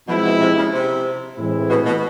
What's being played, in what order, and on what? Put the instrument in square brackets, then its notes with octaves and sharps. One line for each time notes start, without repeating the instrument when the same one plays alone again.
[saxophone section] B2 [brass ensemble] F3 G#3 C4 E4
[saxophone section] B2
C3
C#3
C3
[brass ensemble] A2 E3 G#3 C4 E4
[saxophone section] B2
B2